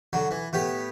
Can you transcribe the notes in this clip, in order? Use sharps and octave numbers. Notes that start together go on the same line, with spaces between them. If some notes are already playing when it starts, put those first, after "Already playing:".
D3 F#3
E3
A2 B3 G4